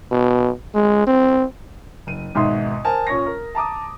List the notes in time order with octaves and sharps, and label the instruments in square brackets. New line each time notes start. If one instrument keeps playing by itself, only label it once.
[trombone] B2
G#3
C4
[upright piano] F#1 D#7
G#1 G#2 B2 E5 C6 D#6
A#4 C5 G#5 A5
A#2 C#4 C#5 C#6 A#6
A#4
A5 A#5 D6 D#6